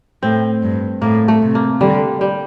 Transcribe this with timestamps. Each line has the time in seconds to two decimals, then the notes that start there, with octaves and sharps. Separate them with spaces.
0.23 A2 C4
0.63 G2
1.02 A2 A#3
1.28 A3
1.42 C3
1.55 A#3
1.81 D3 G3
2.21 G3